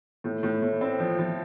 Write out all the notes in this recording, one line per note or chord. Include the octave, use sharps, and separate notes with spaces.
A2
A2
A2
C4
F3
F3